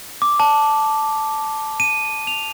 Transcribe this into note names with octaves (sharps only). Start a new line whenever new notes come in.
D6
A5
D#7
F7